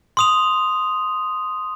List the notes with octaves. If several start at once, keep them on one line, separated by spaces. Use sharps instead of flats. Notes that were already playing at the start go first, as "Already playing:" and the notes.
C6 D#6 F7